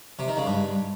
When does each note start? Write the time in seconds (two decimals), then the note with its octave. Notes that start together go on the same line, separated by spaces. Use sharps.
0.19 C3
0.28 D#3
0.37 C#3
0.46 G2